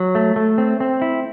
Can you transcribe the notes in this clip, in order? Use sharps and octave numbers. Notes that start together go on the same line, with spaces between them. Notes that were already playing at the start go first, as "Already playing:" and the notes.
Already playing: F#3
A3
A3
C4
C4
E4